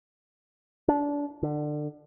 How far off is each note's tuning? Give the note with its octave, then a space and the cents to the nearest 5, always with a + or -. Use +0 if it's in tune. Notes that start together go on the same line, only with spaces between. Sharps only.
D4 -25
D3 +25